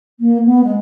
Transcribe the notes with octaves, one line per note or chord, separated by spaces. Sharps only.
A#3
B3
G#3